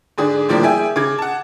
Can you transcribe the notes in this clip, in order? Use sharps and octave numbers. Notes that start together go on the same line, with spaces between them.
G#2 D3 D4 G#4 D#6
A2 D3 F3 G3 A#3
E4 G#4 E5 G5 G#5
C#3 D6 G#6
F#5 A5